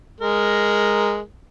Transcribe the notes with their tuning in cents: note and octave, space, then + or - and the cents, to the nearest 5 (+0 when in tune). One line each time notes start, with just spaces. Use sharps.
G#3 -5 A#4 +0